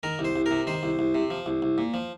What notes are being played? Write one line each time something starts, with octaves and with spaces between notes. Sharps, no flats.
D#3 A#4
C2
C5
C2
A#4
C3
D#3 C5
C2
C2
C3
F3
C2
C2
A#2
F3